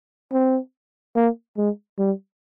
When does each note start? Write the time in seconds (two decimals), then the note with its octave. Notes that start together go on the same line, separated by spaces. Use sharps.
0.33 C4
1.16 A#3
1.57 G#3
1.99 G3